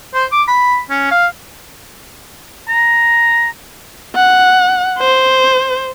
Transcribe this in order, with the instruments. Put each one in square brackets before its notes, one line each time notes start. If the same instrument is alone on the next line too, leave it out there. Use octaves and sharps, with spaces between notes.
[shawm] C5
D6
B5
C#4
F5
A#5
[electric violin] F#5
C5